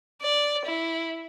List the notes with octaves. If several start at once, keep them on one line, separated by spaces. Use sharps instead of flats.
D5
E4